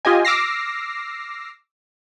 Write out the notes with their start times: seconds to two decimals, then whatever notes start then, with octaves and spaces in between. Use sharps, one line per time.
0.05 F4 G4 D#5 G#5
0.25 D6 E6 F6 A#6 C7